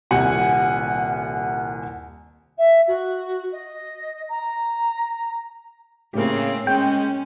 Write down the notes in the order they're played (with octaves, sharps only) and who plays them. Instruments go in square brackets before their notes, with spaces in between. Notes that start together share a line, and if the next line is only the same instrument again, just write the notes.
[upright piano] D#1 C2 F#5 G#5
[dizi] E5
F#4
D#5
A#5
[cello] A2 C4 [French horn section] C#3 [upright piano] A#3 G4
[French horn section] G#3 [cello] C#4 [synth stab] G5